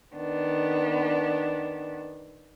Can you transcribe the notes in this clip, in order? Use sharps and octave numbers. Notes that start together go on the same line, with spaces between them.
D#3 B3 D4